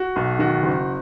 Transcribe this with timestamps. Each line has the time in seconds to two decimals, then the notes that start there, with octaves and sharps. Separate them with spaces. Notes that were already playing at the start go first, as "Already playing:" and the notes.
Already playing: F#4
0.16 B1
0.39 D#3 F#4
0.63 F#1